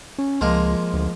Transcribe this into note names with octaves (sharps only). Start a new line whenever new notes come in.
C#4
C#2 F3 G#3 A#3
D2